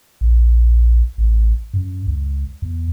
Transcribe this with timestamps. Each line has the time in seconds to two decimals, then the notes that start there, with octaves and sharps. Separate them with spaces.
0.21 A#1
1.18 A1
1.74 F#2
2.07 C#2
2.62 E2